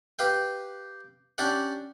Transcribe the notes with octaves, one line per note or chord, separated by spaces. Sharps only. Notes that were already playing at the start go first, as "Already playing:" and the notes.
G4 B4 F5 G5
C#4 D4 G4 D5 F#5